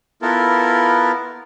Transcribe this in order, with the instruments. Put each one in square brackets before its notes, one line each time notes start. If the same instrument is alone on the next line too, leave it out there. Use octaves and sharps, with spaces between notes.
[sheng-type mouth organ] B3 E4 F4 A4 A#4